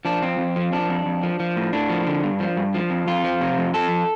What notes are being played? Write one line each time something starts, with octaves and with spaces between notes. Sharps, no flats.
F3 D4
F2 C4
F2
F3
F3 D4
F2
F2
F3
F3
A2
A2 D4
F3
D3
G2
F3
G2
F3
F2
F2 F4
F3
C3
F2
F3 A4